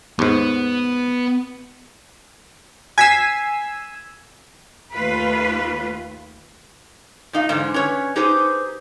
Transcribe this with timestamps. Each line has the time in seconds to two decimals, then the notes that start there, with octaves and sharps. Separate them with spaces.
0.19 D#2 G#2 B3
2.98 G#5 E6 G#6 B6 C7
4.93 D#2 A3 F4 B4
7.33 A#2 D#4 F5
7.49 G#2 D3 E3
7.74 C#4 B4 C#5
8.16 D#4 G4 G#4 B4 C5